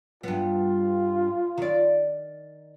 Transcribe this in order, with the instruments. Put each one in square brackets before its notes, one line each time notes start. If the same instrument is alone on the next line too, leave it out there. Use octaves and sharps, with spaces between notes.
[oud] G2 B3 [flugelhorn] F4
[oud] D#3 D5